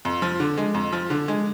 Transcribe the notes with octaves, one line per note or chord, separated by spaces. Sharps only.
F2
F3
D3
G#3
F2
F3
D3
G#3